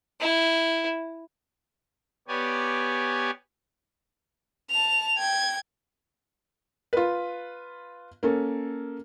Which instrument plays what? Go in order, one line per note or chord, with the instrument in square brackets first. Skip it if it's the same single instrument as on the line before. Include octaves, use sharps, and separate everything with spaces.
[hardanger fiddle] E4
[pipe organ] B3 G4 C#5 D5 G#5
[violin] A5 F7
G5 G#6
[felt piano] F4 B4
A#3 C#4 A4